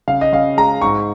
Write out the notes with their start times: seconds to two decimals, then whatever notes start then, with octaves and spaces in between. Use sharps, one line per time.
0.08 C#3 F5
0.21 D#5
0.32 C#3 F5
0.57 G#3 A#5
0.82 G#2 C#6